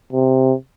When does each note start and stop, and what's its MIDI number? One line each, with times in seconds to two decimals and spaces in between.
0.13 0.54 48